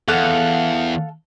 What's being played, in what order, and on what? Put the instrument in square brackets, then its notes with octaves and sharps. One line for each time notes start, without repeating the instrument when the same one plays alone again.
[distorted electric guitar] E2 [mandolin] A4 F5 F#5